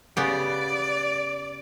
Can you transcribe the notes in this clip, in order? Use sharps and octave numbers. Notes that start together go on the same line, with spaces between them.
C#3 B3 G4 D5